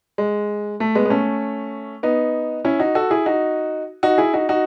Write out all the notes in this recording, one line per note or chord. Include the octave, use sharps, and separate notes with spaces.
G#3
A3
G#3 B3
B3
A3 C#4
B3 D#4
C#4 E4
D#4 F#4
F#4 A4
E4 G#4
D#4 F#4
D#4 F#4
E4 G#4
D#4 F#4
D#4 F#4